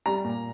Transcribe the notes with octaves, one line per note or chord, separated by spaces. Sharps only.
G3 A#5
A#2